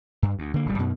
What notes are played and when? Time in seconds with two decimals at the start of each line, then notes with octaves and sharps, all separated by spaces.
0.22 G2
0.39 D2
0.54 D3 A#3
0.66 D1 G1 G3
0.79 F#2 B2